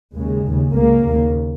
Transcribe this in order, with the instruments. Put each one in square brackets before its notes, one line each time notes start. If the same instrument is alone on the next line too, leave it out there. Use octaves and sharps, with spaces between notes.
[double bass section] D#2 C#3 G#3
D#2 C#3
C#2 C#3 A#3
D#2 C#3